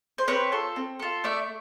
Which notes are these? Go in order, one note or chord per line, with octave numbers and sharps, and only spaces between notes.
C5
C4 B4 C#5
F4 A4
C4
F4 A4
A3 D5 E5